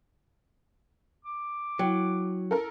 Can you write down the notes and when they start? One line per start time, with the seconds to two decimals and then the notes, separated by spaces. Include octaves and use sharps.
1.25 D6
1.79 F#3 E4 G5
2.51 A4 A#4